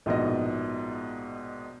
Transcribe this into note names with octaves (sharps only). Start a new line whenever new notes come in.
A#1 G#2 B2 D#5